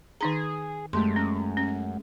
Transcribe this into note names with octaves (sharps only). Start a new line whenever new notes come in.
D#3 D#4 G#4 A#5
F#2 G#3 A3 G4 C6
C#4
C#4